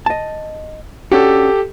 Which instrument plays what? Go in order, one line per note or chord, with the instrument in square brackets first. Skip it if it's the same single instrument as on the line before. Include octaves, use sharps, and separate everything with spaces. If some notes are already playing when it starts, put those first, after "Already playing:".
[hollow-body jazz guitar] D#5 A5
[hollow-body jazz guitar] C#4 D4 F#4 [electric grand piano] G4 A4